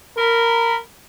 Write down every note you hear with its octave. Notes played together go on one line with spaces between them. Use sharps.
A#4 B5